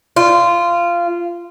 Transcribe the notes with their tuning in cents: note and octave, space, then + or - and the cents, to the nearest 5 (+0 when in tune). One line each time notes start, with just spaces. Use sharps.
F4 -15